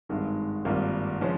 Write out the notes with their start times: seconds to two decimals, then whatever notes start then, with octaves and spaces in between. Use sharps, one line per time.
0.09 G#1 G2 D#3 G#3
0.65 G#1 G2 G3 A#3 F4
1.21 C#3 F3 G#3 C#4